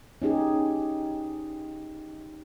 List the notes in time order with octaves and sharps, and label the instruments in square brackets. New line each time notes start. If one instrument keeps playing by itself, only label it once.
[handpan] C#4 D#4 G4 G#4